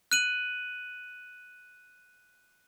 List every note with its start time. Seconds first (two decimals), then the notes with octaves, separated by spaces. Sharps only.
0.12 F#6 D#7 F#7